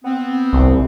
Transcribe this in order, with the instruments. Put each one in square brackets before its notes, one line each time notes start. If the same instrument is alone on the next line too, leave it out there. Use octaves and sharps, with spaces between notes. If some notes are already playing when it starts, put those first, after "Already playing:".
[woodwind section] B3 C4
[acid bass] C2